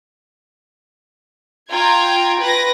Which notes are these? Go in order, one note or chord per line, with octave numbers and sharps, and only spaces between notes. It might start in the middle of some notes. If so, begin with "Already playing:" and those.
F4 G5 A#5 G#6
B4 A#6